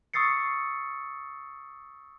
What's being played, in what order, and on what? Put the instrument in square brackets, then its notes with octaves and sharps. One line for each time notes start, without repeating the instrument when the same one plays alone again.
[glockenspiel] C#6 D#6 E6 A6 C7 C#7